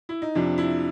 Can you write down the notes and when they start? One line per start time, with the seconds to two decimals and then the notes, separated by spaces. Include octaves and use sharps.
0.09 E4
0.22 D#4
0.35 F2 C3 F3 D4
0.58 E4